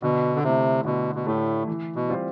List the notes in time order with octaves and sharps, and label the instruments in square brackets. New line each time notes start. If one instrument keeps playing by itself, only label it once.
[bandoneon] B2 [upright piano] D3
[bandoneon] D3
[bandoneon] C3 [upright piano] A3 E4 G4
[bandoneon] B2 [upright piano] D3
[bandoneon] B2
[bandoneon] A2 [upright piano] A3 E4 G4
[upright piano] E3
[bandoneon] B2
[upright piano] G3 C4 F4 C5